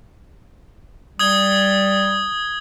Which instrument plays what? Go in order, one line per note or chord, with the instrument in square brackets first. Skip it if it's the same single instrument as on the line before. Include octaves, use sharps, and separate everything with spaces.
[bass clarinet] G3 [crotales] D#6 G#6 G7